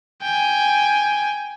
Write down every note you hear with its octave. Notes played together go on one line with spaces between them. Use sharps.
G5 G#5